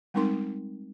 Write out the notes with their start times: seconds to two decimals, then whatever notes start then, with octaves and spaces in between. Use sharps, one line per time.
0.14 G3 G#3 C4 D#4 A#4 C6